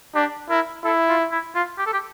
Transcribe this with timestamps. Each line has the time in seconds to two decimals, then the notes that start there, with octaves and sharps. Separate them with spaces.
0.15 D4 G4
0.50 E4 A#4
0.84 E4 A4
1.09 F4
1.31 E4
1.55 F4
1.78 G4
1.86 A4
1.93 G4